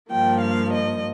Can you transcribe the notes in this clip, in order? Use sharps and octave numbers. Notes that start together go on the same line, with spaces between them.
G2 F3 A#3 G5
F5
D#5